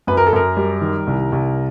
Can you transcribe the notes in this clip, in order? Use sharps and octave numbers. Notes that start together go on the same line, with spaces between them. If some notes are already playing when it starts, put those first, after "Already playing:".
F#2 B4
A#4
A4
F#2 A#4
G3
D#3
C2
C2